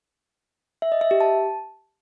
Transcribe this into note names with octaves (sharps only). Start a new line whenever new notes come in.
E5
D#5
E5
G4
A5